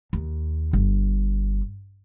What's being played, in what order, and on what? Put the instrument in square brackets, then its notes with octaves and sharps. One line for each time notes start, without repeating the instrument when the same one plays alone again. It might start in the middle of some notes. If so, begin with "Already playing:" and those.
[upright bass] D#2
G1